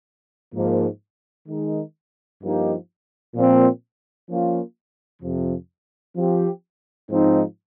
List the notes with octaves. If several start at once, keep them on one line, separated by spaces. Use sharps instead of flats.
G#2 F3 A#3
D#3 G#3 D#4
G2 F3 A#3 D#4 G4
A#2 F3 C4
F3 A#3 C#4 F4
F2 C3 F3
F3 C4 G4
G#2 F3 C4 D#4